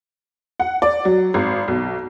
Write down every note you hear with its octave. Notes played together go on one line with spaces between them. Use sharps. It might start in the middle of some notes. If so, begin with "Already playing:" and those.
F#5
D5
F#3
G#1
B1